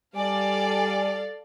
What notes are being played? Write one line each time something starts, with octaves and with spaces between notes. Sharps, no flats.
G3 A4 D5 F5 G#5